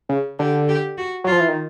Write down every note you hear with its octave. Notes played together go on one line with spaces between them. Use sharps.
C#3
D3 G4
G4
F#4
F#3 F4
F3
E3
D#3